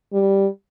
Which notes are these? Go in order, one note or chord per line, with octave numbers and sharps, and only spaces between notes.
G3